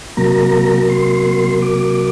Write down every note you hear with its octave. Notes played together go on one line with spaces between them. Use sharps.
C3 F#3 A#3 A#5
C6
D6